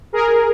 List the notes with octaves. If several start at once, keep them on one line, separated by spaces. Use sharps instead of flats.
G#4 A#4